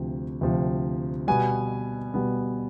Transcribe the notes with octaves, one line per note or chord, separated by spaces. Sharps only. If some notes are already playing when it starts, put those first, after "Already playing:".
Already playing: D2 C3 F3
D2 C3 F3
B2 G3 B3 G#5
B2 G3 B3